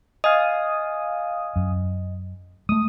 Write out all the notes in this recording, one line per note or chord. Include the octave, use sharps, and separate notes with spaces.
D#5 F5 G#5 D#6
F#2
G#3 A3 D#6